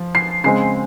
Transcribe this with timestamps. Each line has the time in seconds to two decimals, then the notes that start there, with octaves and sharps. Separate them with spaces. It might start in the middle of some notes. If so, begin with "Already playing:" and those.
Already playing: F3
0.15 C7
0.44 C#3 G#3 C4 C7